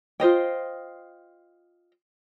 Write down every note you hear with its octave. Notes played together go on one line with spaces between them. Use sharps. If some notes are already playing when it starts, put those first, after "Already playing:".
F4 C5 D#5 G5